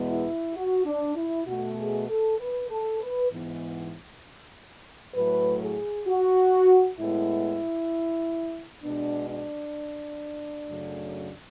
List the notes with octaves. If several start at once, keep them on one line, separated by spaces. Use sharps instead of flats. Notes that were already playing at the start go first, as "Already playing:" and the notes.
Already playing: E2 B2 G#3 B3
E4
F#4
D4
E4
B2 A3 F#4
G#4
A4
B4
A4
B4
G#2 E3 B3
A2 F#3 A3 B4
G#4
F#4
A2 G#3 B3 E4
B2 G#3 B3 D4
D4
F#2 C#3 F#3 A3